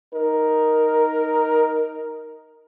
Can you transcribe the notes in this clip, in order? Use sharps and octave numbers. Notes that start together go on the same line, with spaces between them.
D#4 A#4